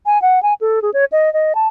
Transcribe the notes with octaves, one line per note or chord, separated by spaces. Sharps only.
G#5
F#5
G#5
A4
G#4
C#5
D#5
D#5
A5